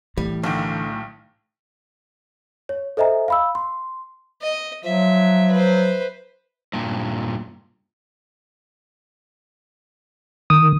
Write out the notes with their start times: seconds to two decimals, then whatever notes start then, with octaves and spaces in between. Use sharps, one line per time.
0.17 A2 E3 G3
0.43 B1 D3 D#3
2.69 C#5
2.97 A4 C5 D#5 E5 G#5 A#5
3.28 F5 B5 E6
3.55 C6
4.42 D#5
4.84 F3 F#3 E5
5.51 B4 C5
6.73 G2 A#2
10.50 D#3 D#6